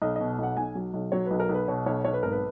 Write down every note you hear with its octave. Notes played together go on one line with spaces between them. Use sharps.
B1 D#5
B2 D#5
B1 F#5
B1 G#5
F#3
B1
F#3 C#5
B1 B4
A#4
B1 B4
B2 C#5
B1 C#5
B1 C#5
B4
G#1 A#4
B4